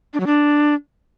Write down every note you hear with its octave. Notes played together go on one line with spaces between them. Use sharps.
D4
F#3
D4